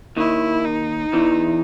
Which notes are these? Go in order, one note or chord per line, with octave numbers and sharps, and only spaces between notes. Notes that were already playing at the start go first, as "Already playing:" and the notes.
D#2 D#3 E4
D#4
E2 E3